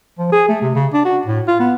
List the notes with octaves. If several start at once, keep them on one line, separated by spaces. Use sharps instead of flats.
F3
G#4
A3
C3
C#3
D4
F#4
A2
F4
B3